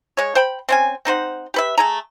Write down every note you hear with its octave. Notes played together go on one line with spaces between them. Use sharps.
G#3 C#5
C5 G5 B5
C4 C#4 G#5
C4 D#4 C5 F#5
G4 B4 E5
A3 G#4 A#5